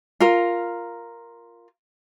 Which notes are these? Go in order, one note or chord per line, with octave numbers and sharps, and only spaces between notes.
F4 A#4